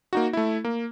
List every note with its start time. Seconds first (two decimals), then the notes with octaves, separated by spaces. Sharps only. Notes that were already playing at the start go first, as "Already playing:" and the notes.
0.13 A#3 D#4 F#4
0.33 A3 E4
0.65 A#3